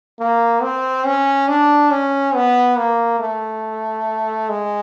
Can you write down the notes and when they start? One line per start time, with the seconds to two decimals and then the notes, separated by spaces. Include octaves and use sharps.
0.19 A#3
0.62 C4
1.06 C#4
1.48 D4
1.91 C#4
2.35 B3
2.77 A#3
3.20 A3
4.49 G#3